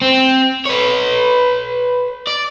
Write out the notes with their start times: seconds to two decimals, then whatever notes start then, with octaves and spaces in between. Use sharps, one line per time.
0.02 C4
0.65 B4 C#5
2.27 D5